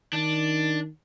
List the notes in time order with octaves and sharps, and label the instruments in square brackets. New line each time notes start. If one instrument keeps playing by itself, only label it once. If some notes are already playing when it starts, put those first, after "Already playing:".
[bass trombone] D#3 [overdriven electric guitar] D4